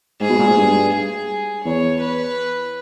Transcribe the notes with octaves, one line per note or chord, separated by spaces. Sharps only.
G#2 G#4
B2
A#2
G#2
G2
G#4
E2 C#5
B4